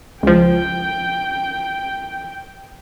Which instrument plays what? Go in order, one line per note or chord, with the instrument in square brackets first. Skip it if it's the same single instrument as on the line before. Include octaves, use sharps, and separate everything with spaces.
[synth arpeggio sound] C#2 F3 [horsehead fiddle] G5